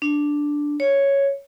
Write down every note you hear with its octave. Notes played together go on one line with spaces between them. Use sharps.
D4
C#5